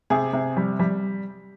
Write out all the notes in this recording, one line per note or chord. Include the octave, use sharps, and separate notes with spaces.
C3 G#4
C3
G3
G3